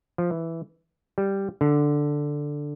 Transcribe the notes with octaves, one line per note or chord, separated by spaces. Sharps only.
F3
E3
G3
D3